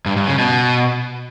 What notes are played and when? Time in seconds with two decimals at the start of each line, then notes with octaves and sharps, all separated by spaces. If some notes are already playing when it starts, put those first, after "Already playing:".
0.06 G2
0.17 G2
0.27 C#3
0.38 B2